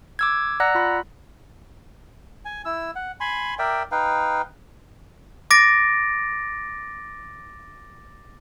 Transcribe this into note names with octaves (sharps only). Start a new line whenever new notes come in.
D6 E6 G#6
D5 F#5 A#5 E6 F#6 A#6
F4 B5
G#5
E4 E6
F#5
G#5 B5 C6
A#4 D5 E5 G5
D#4 B4 F5 G5
D6 A6 A#6 D7